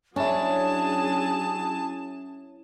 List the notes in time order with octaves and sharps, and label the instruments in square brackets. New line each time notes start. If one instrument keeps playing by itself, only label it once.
[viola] F#3 G#4 [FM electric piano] C#4 E4 [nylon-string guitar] D4 [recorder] A5